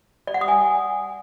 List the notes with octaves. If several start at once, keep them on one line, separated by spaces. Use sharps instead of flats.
D5
F#5
D#6
G#5